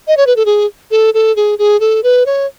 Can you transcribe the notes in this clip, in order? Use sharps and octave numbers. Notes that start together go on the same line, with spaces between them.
D#5
C#5
B4
A4
G#4
A4
A4
G#4
G#4
A4
B4
C#5